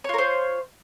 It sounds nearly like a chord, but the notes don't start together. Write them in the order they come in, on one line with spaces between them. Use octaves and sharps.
C#5 F4 A#4 C5